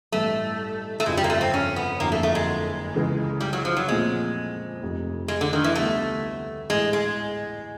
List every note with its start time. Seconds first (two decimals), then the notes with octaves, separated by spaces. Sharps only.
0.12 A1 G2 E3 A3
1.00 A3
1.06 G1 F2 C#3 F3 G#3
1.17 G3
1.24 A#3
1.30 A3
1.41 C4
1.54 C#4
1.76 B3
2.00 F#1 F2 D3 F#3 A#3
2.12 A3
2.23 A3
2.35 G#3
2.94 C#2 C#3 E3
3.40 G3
3.53 F#3
3.65 F3
3.77 F#3
3.88 A#2 F3 G#3 A3 C4
4.82 F1 F2 C3
5.28 G#3
5.41 D3
5.53 D#3
5.64 E3
5.76 D2 D3 G3 A3 B3 E4
6.70 A1 G#2 E3 G#3
6.93 G#3